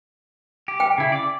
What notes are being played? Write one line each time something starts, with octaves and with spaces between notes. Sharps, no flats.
G4
G5
C#3 E4
D5 D6